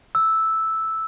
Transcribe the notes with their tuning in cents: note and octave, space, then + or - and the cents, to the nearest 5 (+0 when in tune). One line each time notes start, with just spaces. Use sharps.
E6 -5